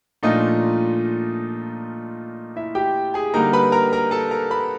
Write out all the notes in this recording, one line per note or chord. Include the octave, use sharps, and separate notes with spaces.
A#2 F3 A3 D4 D#4 F4 D#5
E4 E5
G4 G5
G#4 G#5
D3 G3 A#3 D#4 A#4 A#5
B4 B5
A#4 A#5
A#4 A#5
A4 A5
A#4 A#5
B4 B5